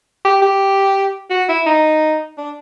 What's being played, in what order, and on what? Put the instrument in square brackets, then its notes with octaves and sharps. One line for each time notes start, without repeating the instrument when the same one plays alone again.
[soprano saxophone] G4
G4
F#4
E4
D#4
D4